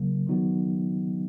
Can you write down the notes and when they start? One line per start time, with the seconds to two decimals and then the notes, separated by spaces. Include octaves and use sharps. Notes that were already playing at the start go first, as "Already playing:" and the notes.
Already playing: C#3 F#3 A#3
0.27 D#3 F#3 B3 D#4 F#4